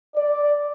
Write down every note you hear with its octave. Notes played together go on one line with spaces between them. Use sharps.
D5